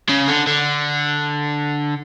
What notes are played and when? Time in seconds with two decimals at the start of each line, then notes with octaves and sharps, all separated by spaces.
0.09 C#3
0.28 D3
0.47 D3